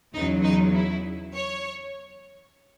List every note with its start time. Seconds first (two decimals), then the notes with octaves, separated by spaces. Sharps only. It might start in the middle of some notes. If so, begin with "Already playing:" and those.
0.14 E2 C#3 F#3 D#4
0.43 D#4
0.74 E4
1.34 C#5